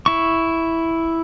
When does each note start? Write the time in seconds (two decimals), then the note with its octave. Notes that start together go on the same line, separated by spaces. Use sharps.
0.06 E4 C#6